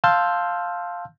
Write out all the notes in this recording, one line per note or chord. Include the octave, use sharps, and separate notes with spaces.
F5 A5 C6 E6 F6 G6